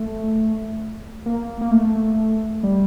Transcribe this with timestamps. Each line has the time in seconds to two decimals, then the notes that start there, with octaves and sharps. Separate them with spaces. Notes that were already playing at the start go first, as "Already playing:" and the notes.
Already playing: A3
1.26 A#3
1.61 A#3
1.71 A3
2.63 G3